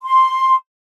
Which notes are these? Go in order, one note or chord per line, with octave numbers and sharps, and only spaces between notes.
C6